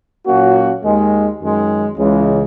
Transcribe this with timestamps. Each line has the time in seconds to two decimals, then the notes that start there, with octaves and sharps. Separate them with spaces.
0.26 A#2 F#3 A#3 C#4 F#4
0.83 D#2 D#3 G#3
1.41 F#2 D#3 G#3
1.98 C#2 C#3 E3 G#3